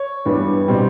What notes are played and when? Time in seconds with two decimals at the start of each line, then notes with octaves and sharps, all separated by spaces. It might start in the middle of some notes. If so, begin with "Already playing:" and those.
Already playing: C#5
0.25 G2 E3 G3 B3
0.68 B2 G3 C4